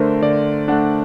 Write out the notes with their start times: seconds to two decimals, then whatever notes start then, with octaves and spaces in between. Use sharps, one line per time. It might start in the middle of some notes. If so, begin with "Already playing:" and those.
Already playing: D3 A3 D4 A#4 C5
0.22 D3 D5
0.68 A3 D4 F#5